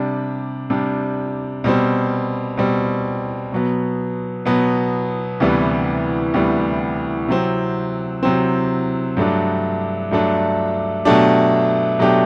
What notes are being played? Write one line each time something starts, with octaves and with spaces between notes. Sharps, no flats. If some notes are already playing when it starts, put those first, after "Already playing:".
Already playing: C3 G3 D4
C3 G3 D4
B2 G3 C4
B2 G3 C4
B2 F#3 B3
B2 F#3 B3
D2 C3 E3 G3 B3
D2 C3 E3 G3 B3
C3 F#3 C4
C3 F#3 C4
G2 F#3 A3 D4
G2 F#3 A3 D4
B2 F#3 A3 D4 G4
B2 F#3 A3 D4 G4